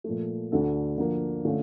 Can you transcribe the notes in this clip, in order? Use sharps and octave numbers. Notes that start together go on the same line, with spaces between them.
A#2 F3 A3
D2 D3 A3 D4 A4
D3 F3 A#3
D3 A3 C#4 F4